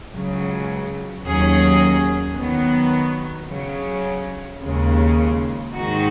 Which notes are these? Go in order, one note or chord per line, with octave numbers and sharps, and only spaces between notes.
C#2 C#3 F#3
D#2 D#3 F#3 C#4 G#4
D#3 F#3 B3
C#3 F#3 C#4
D#2 C#3 G#3
G#2 D#3 G#3 D#4 F#4